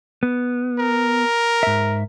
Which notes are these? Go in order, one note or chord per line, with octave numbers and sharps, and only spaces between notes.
B3
A#4
G#2 E5